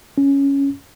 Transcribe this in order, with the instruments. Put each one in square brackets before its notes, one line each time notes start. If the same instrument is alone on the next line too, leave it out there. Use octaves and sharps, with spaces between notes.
[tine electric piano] C#4